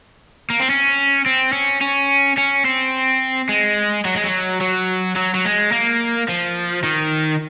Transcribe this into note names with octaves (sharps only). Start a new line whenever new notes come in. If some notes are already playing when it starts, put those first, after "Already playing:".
A#3
C4
C#4
C4
C#4
C#4
C#4
C4
G#3
F#3
G#3
F#3
F#3
F#3
F#3
G#3
A#3
F3
D#3